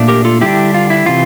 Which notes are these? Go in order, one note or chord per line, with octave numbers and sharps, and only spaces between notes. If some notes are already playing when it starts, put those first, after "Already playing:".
Already playing: A#2 A3 D4
G4 A#4
F4 A4
D3 G3 D4 E4 G4
F4
E4
C3 E3 F4